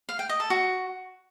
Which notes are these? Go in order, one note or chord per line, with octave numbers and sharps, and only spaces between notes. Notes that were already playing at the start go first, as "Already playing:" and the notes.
F5
G5
D#5
A4
F#4